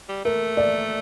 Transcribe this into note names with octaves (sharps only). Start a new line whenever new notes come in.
G3
A3 A#4
D5